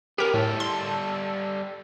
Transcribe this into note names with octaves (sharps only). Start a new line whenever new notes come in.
B3 C#4 G4 A#4
A2 G3 A4
C6